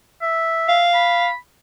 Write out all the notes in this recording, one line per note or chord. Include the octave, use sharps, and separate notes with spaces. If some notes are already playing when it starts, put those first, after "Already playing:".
E5
F5
B5